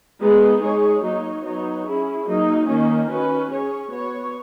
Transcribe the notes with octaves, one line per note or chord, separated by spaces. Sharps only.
G#3 B3 D#4 G#4
G#3 D#4 G#4 C#5
F#3 A#3 D#4 F#4 C#5
F#3 B3 D#4 F#4 C#5
C#4 E4 G#4
F#3 A#3 D#4
D#3 A#3 C#4
C#4 F#4 B4
C#4 G#4 C#5
B3 F#4 C#5